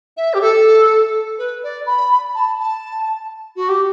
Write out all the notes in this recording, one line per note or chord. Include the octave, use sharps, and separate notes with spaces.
E5
G4
A4
B4
D5
B5
A5
A5
F#4
G4